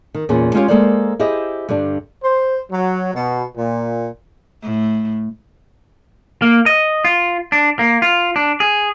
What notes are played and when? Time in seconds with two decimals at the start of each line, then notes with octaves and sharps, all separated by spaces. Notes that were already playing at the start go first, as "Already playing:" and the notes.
0.15 D#3
0.29 E2 A#2 C#4 G#4
0.54 G#3 C#4 F4 G4 A#4 C#5
0.68 G#3 A#3 A4 A#4 C5 D5
1.19 E4 G4 G#4 C5 D#5
1.69 G2 D3 G3 D4
2.23 C5
2.72 F#3
3.15 B2
3.57 A#2
4.62 A2
6.42 A#3
6.66 D#5
7.05 F4
7.52 D4
7.79 A#3
8.02 F4
8.36 D4
8.60 G#4